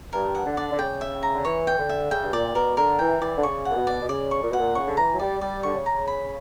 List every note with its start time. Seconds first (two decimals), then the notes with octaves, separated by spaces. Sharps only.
0.13 G2 A#4
0.35 F#5
0.46 D3
0.57 D5
0.71 D3
0.79 C#3 G5
1.01 E5
1.23 A#5
1.35 D3
1.45 E3 C#5
1.67 G5
1.78 D3
1.89 E5
2.11 C#3 G5
2.23 G2
2.33 A#2 D5
2.55 B2 A#4
2.77 D3 A#4
2.99 E3 G5
3.21 E3 D5
3.36 D3
3.43 C#3 C#6
3.65 A#2 F#5
3.76 B2
3.87 D5
4.02 B2
4.09 C#3 D5
4.31 C#6
4.42 A#2
4.50 B2 F#5
4.58 A#2
4.75 C#3 C#6
4.87 D3
4.97 E3 A#5
5.14 F#3
5.19 G3 D5
5.41 G3 D5
5.63 D3 C#6
5.75 C#3
5.86 A#5
6.08 B5